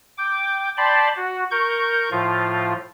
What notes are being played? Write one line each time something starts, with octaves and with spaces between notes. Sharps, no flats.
G5 D6
D5 G5 A5 B5 C6
F#4
A#4 C#6 G6
A2 F3 F4